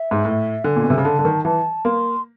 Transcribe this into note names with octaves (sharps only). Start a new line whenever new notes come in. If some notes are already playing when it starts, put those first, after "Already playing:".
Already playing: E5
G#2
A2
D3 G#5
A#2
B2
C3
C#3
D3 A5
D3
D#3
E3 A5
A#3 C6